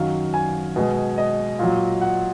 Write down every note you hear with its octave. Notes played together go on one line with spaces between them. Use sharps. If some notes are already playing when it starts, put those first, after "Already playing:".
Already playing: F#2 D#3 F#3 F5
G#5
B2 G#3
D#5
A#2 F#3
F#5